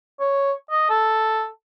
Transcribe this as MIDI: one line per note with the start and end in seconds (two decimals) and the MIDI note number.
0.20 0.53 73
0.71 0.86 75
0.90 1.47 69